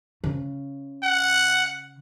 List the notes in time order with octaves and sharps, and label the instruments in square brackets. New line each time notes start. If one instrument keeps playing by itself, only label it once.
[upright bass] C#3
[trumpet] F#5